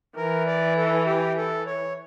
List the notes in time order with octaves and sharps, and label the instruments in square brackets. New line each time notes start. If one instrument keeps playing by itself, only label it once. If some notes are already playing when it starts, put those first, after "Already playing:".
[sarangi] E3 [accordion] A#4
[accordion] D5
A4
G4
A4
C#5